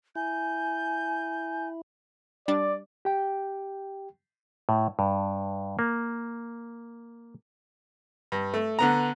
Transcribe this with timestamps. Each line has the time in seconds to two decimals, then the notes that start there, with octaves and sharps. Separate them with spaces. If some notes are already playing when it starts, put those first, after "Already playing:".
0.16 E4 G#5 G6
2.48 G3 D4 D5 A6
3.05 G4 G5
4.69 A2
4.99 G2
5.79 A#3
8.32 G2
8.54 A3
8.79 D3 B3 A#5